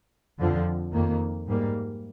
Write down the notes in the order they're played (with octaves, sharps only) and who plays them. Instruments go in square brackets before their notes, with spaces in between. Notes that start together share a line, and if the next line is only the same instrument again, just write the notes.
[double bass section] F2 D3 F3 C4
F2 D#3 A#3
G#2 G3 A#3